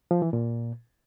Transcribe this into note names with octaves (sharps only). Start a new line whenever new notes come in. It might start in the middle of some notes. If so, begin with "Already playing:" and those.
F3
E3
A#2